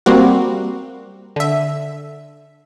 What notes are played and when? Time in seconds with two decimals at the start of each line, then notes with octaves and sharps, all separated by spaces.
0.06 G3 A#3 C4 F#4
1.36 D3 E5